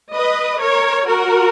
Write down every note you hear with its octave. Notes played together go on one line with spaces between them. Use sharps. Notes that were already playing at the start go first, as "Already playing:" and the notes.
B4 D#5
A#4 C#5
F#4 A#4